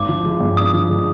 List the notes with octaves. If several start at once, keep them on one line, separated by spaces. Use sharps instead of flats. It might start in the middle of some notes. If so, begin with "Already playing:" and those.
Already playing: G#1 D6
F3
G#3
G2
G#1 D#6
F3
G#3